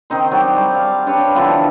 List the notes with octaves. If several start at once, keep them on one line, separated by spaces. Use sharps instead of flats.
D#3 C4 D#4 C6
F#3 G4 D5
G3
F5 A5
D4 G4 B4 C#5
D3 E3 F3 B3